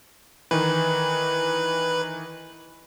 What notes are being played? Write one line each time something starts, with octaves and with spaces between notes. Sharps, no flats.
D#3 E3 B4